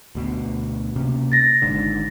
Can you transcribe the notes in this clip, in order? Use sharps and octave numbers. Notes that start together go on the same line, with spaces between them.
D2 B2
C3 A#3 C#4
A6 A#6
G#1 G#2 D3